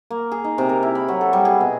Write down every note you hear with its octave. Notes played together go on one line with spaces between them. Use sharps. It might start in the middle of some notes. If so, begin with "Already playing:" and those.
A#3
G#4
D#4
C3
A#4
E4
B5
F#3
A4
G3
G#4
B2